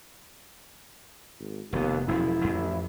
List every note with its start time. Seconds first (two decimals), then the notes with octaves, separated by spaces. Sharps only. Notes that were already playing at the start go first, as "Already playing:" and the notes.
1.40 G#1
1.73 F1 D#2 B3
2.08 E1 F#2 F3 E4
2.44 A1 F2